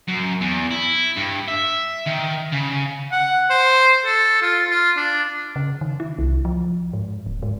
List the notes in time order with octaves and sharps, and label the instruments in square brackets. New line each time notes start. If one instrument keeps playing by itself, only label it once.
[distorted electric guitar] F#2
E2
E4
G2
E5
D#3
C#3
[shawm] F#5
C5
A4
F4
F4
D4
[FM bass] C#3
D#3
E4
C2
F3
G#2
D#1
G#2